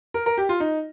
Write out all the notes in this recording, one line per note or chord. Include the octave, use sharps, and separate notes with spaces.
A#4
A#4
G4
F4
D#4